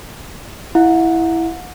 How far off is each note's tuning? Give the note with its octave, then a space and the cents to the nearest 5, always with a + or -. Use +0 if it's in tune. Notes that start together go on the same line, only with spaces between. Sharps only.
E4 +0 F#5 -35